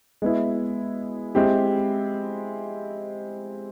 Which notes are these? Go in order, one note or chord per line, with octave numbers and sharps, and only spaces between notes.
G#3 B3 E4
G#3 C4 E4 G4